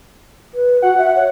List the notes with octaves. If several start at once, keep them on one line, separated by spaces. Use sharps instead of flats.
B4
F#4 F#5
E5
C#5